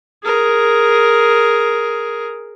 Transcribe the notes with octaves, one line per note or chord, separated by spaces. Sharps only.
G#4 A#4